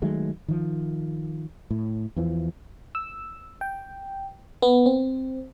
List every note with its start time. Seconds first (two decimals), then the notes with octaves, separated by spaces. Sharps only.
0.02 D#3 F#3 G#3 A3
0.48 D#3 F3
1.71 A2
2.16 E2 E3 F3
2.95 E6
3.61 G5
4.62 B3
4.86 C4